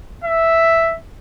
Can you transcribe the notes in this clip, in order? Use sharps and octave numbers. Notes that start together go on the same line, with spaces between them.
E5